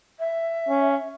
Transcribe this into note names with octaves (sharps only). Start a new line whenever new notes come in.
E5
C#4